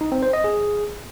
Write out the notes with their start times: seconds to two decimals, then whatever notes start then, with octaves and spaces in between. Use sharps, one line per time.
0.01 D#4
0.12 C4
0.23 C5
0.33 D#5
0.44 G#4